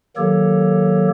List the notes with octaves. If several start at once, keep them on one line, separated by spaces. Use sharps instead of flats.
D#3 F#3 A#3 G4 A4 C#5